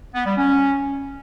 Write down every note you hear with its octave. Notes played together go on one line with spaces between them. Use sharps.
B3
G3
C#4